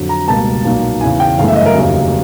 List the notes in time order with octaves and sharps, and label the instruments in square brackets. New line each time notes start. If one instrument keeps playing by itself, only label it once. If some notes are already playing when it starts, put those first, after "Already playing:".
Already playing: [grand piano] F2 D3 F#3
A#5
C#2 B2 G3 A#3 A5
B1 A#2 F#3 A#3
E2 C#3 E3 G#5
G5
G1 F#2 C#3 E3 A3 F5
E5
D#5
A#4
F1 D#2 C#3 F#3